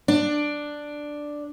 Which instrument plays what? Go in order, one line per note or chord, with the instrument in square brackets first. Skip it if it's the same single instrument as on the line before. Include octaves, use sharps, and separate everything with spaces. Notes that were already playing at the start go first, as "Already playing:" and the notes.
[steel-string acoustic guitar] D4